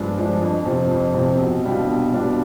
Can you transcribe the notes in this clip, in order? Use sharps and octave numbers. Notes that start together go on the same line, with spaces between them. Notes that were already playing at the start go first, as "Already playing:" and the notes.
Already playing: G2 F3 G#3 D4
F3 G#3 D4
F2
C3 F3 C4
F2
C3 F3 C4
B1
B2 G3 D4 F4
B1
B2 G3 D4 F4